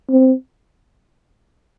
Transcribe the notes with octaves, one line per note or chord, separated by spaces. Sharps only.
C4